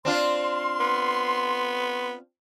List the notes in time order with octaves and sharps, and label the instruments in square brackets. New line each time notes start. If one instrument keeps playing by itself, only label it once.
[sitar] C4 D4 F4 [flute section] C6
[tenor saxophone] B3